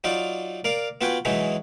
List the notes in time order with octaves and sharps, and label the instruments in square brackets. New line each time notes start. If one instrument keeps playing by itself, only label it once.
[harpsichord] F#3 D#4 F4 D5
A#4 D5 F5
B3 F4 F#4 B4 G5 G#5
E3 F#3 G#3 D#4 E4